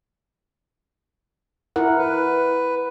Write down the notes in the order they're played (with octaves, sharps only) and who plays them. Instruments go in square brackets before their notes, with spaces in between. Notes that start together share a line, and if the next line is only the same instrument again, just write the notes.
[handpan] E4 A#4 F#5
[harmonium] B4